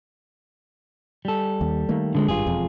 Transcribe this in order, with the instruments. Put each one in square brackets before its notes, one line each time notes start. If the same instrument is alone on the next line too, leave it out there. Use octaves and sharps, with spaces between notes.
[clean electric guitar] G3 A4
[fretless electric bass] D#2
D#3 A3 A#3
[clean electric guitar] D3 G#3
[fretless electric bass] G#1 G2 [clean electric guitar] F4 G#4
[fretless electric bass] E1 F2